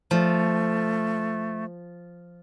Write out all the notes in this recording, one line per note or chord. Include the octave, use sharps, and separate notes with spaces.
F3 A3